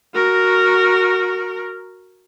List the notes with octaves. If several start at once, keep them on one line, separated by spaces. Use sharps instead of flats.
F#4 A#4